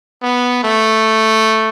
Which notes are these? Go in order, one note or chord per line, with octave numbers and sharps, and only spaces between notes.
B3
A3